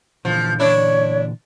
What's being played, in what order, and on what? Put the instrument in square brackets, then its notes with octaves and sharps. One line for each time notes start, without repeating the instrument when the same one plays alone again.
[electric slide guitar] A#2 D3 E3 [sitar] F3
[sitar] D4 E4 [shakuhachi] C#5